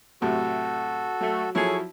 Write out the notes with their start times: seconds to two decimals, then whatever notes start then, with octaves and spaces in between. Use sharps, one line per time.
0.22 A2 C3 F#3 F#4 A4
1.21 F#3 A3
1.55 F3 F#3 E4 G#4 A4 C#5